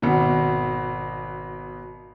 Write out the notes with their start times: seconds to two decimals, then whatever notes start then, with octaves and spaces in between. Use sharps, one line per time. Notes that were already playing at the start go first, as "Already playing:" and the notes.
0.02 G#1 B2